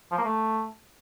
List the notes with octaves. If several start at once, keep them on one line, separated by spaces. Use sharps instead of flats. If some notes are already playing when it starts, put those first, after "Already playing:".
F3
A#3
A3